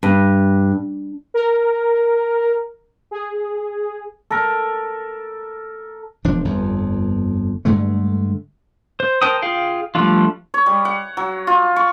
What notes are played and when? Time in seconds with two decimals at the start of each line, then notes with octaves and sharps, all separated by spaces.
0.03 G2
1.34 A#4
3.11 G#4
4.31 A4 A#4
6.25 E1 F3 D4
6.45 G1 F2
7.65 G2 D3 G#3 A3
9.00 C5
9.22 A#4 C5 G5 A5 D#6
9.42 F4 G#4 F5 G5
9.95 F3 G3 A3 D4 F4
10.54 C#5
10.66 G3
10.85 F#5
11.17 F#3
11.47 F4
11.76 C#6